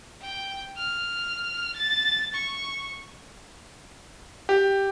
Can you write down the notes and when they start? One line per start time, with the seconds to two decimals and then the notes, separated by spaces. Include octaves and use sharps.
0.21 G5
0.77 F6
1.76 A6
2.34 C#6
4.49 G4